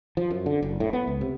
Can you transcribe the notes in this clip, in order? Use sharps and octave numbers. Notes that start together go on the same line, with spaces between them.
F3
F#2
D3
F#1
A2
B3
C#2
C3